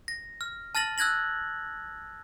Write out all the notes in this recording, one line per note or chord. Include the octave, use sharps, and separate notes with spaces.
A#6
F6
A5 F6 A6 A#6 F#7
E6 F#6 G#6 A#6 F#7